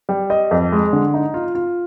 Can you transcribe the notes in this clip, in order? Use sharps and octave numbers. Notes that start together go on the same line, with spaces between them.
G3
D#5
F2
G#3
D3
D#4
F4
F4